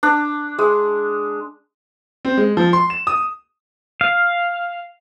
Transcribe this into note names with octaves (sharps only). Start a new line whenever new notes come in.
D4
G#3
C4
G#3
F3
C6
E7
D#6
F5